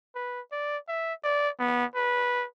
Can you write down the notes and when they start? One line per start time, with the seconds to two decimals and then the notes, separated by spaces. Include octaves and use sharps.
0.15 B4
0.52 D5
0.88 E5
1.24 D5
1.59 B3
1.96 B4